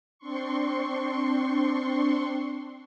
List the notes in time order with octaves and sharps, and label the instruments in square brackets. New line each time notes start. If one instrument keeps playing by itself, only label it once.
[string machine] C4 D4 C6 C#6